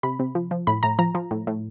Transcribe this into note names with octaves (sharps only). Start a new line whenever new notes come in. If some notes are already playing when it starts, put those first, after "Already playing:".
C3 B5
C3
F3
F3
A2 B5
A2 A#5
F3 A#5
F3
A2
A2